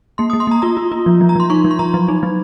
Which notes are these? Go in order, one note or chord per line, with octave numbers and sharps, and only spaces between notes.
A#3 C6
D#6
A#3
C6
A#3 A#5
F4 A#5
F4
F4
F3
F3
A#5
F3 C6
D#4 C#6
F3
C6
F3 A#5
F#3
D#4
F#3